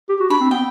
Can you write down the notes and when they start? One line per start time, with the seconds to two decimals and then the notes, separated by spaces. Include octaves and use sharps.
0.09 G4
0.20 F#4
0.30 D4 B5
0.41 C4
0.50 B3 G5